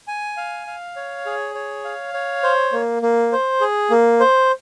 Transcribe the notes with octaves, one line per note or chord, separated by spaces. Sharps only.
G#5
F5
F5
C#5
G#4
C#5
F5
C#5
C5
A#3
A#3
C5
G#4
A#3
C5